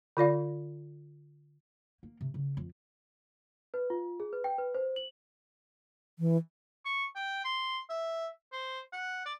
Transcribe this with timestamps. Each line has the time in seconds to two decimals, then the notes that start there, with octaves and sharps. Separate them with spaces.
0.17 D3 F4 D5 F5
2.03 A#3
2.21 C3
2.34 C#3
2.57 F2
3.74 B4
3.90 F4
4.20 G#4
4.33 B4
4.44 G5
4.58 B4
4.75 C5
4.96 F#7
6.19 E3
6.86 C#6
7.16 G5
7.45 C6
7.90 E5
8.53 C5
8.93 F#5
9.26 D5